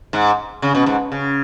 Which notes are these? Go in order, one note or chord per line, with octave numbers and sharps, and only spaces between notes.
G#2
C#3
B2
G#2
C#3